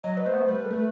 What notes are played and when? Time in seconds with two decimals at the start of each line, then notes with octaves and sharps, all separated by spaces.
0.04 F#3 D#5
0.17 B4
0.25 A3 C5
0.33 B3
0.40 A3
0.48 G3 B4
0.65 A4
0.70 A3 B4